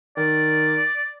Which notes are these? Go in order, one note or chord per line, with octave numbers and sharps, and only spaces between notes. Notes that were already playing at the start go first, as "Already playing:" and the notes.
D#3 D5